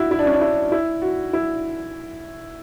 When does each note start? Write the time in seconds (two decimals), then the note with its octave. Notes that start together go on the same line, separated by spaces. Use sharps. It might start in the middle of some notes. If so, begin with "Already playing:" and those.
Already playing: E4 F#4
0.11 E4
0.19 D4
0.26 C#4
0.34 D4
0.41 E4
0.72 E4
1.02 F#4
1.33 E4